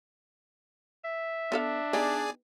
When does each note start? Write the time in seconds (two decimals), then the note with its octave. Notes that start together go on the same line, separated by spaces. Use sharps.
1.04 E5
1.52 B3 D4 A4 F5
1.93 B3 D#4 G4 G#4 D5 G#5